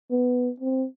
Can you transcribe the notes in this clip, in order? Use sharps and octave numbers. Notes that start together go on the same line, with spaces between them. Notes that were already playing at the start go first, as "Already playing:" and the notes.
B3
C4